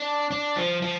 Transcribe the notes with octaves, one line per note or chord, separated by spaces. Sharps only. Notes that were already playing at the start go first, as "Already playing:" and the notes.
Already playing: D4
D4
F3
F3